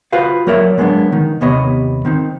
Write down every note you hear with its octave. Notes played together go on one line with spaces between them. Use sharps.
F4 F#4 B4 C5 F5
F#3 A#3 A#4 C#5 D5 E5
F#3 G#3 A#3 B3 D4
D#3 D#4
D#2 C3 B3 C#5 D#5
D#3 C4 D#4